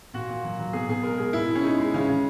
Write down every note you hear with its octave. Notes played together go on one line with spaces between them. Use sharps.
A#2 F#4
A#2
F#3
F#3
B2 G#4
B2 G#4
G#3 A#4
G#3 G#4
B2 E4
B2
C#4
G#3 D#4
G#3
C#3 C#4
C#3